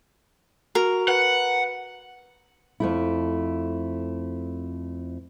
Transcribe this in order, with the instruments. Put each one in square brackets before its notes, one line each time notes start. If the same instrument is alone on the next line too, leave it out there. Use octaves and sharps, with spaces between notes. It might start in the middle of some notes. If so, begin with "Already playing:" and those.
[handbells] F#4 [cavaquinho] A#4
[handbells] B4 [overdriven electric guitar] F#5
[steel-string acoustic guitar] F2 A3 E4